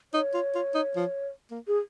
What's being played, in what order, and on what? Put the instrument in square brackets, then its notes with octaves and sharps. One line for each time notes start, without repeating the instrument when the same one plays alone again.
[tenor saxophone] D#4 [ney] C#5
[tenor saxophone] F4
F4
D#4
F3
A#3
[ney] G#4